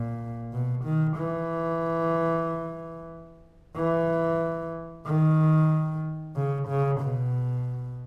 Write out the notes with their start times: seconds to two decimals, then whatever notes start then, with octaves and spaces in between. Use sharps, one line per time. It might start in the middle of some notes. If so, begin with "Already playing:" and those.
Already playing: A#2
0.52 B2
0.84 D#3
1.16 E3
3.76 E3
5.06 D#3
6.36 C#3
6.68 C#3
7.00 B2